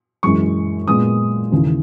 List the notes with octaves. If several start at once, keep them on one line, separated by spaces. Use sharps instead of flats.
F#2 E3 G#3 C#6
A#2 G#3 B3 D#6
D#2 C#3 E3